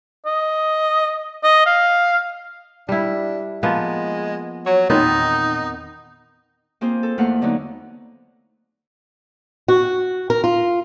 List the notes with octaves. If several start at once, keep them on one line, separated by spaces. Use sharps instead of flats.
D#5
D#5
F5
G3 D4 E4
F3 G#3 A#3 B3
F#3 C#5
E2 A#2 D#3 B3 C4 D#4
A#3 C4 F4 G#4 C5
A4
E2 A3 A#3 B4 F5 F#5
D3 F#3 B3 D#4
F#4
A#4
F4